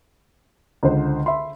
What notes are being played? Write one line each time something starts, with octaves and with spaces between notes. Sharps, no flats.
C#2 D3 C5
E5 B5 C6